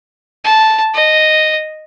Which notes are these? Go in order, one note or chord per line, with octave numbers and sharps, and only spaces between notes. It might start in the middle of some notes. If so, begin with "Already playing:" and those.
A5
D#5